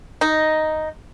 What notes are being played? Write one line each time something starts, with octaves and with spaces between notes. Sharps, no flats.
D#4